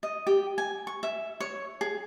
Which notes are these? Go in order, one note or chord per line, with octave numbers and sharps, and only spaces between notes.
D#5
G4
G#5
C#6
E5
C#5
G#4